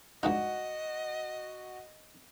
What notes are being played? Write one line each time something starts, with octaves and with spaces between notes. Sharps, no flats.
C#2 G2 D#4 F#4 D#5